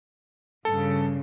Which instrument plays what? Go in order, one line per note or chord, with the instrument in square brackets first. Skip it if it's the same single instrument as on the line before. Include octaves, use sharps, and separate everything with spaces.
[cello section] G2 C#3 [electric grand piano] A4